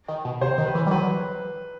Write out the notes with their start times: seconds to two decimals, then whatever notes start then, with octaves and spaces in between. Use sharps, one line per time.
0.08 D#3
0.25 B2
0.41 C3 C5
0.58 D#3
0.66 B4
0.75 E3
0.86 G3
0.91 F#3 B4